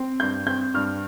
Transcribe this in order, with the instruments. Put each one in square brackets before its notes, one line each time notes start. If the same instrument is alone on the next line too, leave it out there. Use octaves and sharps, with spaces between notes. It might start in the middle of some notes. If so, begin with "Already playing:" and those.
Already playing: [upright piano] C4
G2 G6
C4 G6
G2 F6